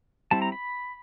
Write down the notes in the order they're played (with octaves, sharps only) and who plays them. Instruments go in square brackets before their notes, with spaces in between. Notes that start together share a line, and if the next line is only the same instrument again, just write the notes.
[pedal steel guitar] G3 C4 E4 A5
A#5
B5